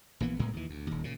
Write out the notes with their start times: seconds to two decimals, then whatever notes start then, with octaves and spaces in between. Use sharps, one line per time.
0.20 A#1 E3 A#3 B3
0.39 C#2 A2 G#3 B3
0.53 D#2 E3
0.70 D2
0.87 D#1 D#2
1.04 A#2 C#3